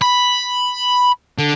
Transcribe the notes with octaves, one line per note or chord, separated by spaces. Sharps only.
B5
D3